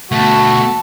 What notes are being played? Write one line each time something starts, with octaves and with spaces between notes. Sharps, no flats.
D2 B2 A3 F#4 A5